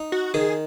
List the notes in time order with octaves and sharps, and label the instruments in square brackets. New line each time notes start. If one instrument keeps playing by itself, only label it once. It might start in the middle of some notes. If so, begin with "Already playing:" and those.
Already playing: [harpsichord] D#4
[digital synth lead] F#4
[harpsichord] D#3 [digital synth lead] G#4